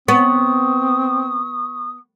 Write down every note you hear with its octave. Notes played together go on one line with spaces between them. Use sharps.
B3 C4 C#6 D#6